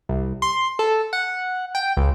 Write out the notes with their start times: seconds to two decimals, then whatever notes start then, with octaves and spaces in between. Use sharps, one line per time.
0.09 C2
0.42 C6
0.79 A4
1.13 F#5
1.75 G5
1.97 C#2